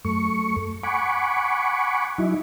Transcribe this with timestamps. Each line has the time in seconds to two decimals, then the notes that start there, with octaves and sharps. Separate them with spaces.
0.05 F#2 A3 C#6
0.83 F#5 G#5 B5 C#6 D6
2.18 F#3 D#4 E4